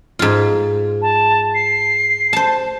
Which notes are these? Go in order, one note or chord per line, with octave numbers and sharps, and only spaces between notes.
G#2 F4
A5
C7
C5 A5